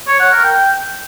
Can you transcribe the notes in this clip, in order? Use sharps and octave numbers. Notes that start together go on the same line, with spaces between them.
C#5
F#5
A#4
G5